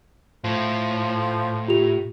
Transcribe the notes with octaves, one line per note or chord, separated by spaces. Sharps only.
A2 F3
F4 G4 F7